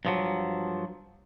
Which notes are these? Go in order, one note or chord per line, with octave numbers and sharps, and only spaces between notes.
G2 F3 F#3